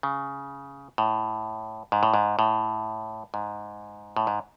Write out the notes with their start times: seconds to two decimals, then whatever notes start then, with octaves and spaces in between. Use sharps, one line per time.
0.03 C#3
0.98 A2
1.92 G#2
2.03 A2
2.14 G#2
2.39 A2
3.34 G#2
4.17 A2
4.27 G#2